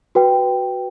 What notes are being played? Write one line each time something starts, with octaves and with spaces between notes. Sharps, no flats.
F#4 B4 G5